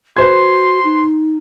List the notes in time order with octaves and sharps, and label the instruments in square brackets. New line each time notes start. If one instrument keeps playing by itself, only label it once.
[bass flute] F#4 [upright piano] B4 C5 G#6 [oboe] C6
[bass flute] D#4